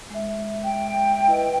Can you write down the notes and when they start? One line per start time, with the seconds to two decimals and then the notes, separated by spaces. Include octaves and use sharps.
0.10 G#3 E5
0.64 G5
1.28 E4 B4 D#5